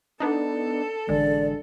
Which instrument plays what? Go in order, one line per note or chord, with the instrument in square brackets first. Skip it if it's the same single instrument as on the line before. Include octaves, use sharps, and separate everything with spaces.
[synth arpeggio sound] B3 D4 D#4 [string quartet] A4
[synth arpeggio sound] A1 G#3 [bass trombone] D3 [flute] D5